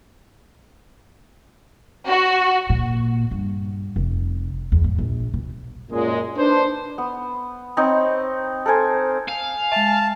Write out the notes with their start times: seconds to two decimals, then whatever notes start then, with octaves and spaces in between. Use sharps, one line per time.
2.08 F#4
2.70 A#2
3.31 G2
3.96 F1
4.72 E2
4.84 G#2
4.98 A#1
5.34 B1
5.91 F#2 A#2 G#3
6.36 D4 D#4 B4 C5
6.98 B3
7.77 C4 D#4 C#5
8.66 A4 A#4 C5 G#5
9.28 F5 G#5
9.72 G#3 E5 A5